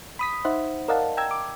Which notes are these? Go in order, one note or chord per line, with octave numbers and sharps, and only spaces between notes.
B5 D#6 B6
D#4 C5 E5 F#5
A#4 D5 D#5 F5 F#5 A5
G5 A#5 E6 G#6
D6